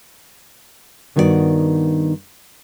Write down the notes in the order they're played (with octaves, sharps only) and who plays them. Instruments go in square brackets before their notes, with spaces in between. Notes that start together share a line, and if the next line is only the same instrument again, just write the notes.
[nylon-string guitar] G2 D#3 B3 F#4 G4 D5